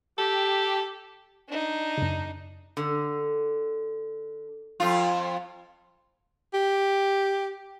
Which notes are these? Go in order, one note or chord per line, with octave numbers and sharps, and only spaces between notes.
G4 A4
D4 D#4
F#2 C#3
D3
F2 F4
G4